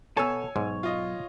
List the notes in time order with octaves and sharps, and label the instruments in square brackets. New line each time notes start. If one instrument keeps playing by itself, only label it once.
[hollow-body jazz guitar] B2 A4 [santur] C#5 [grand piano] G#5 E6 [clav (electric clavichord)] A5
[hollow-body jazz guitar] B1 [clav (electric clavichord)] G#2
[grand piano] F4 D#5